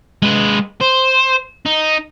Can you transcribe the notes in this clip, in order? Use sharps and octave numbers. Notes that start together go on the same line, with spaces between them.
G#3 B4
C5
D#4